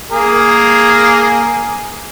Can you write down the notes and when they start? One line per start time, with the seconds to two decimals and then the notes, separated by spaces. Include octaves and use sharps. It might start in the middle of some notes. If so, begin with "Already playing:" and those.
0.11 A#3 G#4 A#4